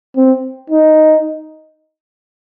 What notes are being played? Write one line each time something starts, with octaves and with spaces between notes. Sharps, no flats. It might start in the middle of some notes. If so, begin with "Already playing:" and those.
C4
D#4